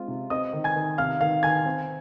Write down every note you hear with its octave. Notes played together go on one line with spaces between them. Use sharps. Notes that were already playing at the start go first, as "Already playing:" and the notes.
Already playing: G#3 C4 F4
C3
C4 D#5 D#6
D#3
G#5 G#6
D#3
C3 F5 F6
D#3 F5 F6
D#3 G#5 G#6
C4